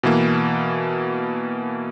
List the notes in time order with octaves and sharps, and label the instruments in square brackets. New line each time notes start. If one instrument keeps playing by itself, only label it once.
[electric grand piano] B2 E3 A#3